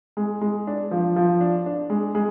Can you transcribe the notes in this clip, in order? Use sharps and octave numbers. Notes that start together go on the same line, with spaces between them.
G#3
G#3
D4
F3
F3
D4
D4
G#3
G#3